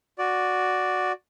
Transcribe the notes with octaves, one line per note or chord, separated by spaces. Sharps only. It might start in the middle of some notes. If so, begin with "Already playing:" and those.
F#4 D5